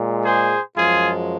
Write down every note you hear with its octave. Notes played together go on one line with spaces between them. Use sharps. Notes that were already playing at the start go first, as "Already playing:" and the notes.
Already playing: A#2 G#3
G#4 C5
F#2 F3 G#3 F4 G#4